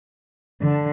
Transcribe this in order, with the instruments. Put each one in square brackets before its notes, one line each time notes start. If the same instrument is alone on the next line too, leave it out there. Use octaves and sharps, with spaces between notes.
[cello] D3